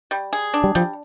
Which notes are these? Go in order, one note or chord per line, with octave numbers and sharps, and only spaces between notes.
G3
G#4
D4
G3
F3 G3